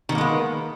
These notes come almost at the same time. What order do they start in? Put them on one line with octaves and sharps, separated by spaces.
D#3 B2 A#3 G#3 B3